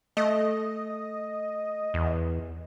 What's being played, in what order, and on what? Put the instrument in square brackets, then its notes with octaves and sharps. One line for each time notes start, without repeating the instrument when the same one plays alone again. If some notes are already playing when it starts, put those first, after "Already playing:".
[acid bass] A3 [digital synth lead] D#5
[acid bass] E2